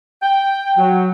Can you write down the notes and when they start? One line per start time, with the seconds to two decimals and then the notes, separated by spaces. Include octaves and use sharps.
0.23 G5
0.78 F#3